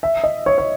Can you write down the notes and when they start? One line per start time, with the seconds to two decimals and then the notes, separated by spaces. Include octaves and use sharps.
0.03 E5
0.24 D#5
0.46 C#5
0.58 C#5